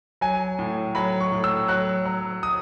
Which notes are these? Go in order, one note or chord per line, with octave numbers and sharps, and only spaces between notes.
F#3 G#5
A2
F#3 B5
C#6
A2
E6
F#3 F#6
F#3
D#6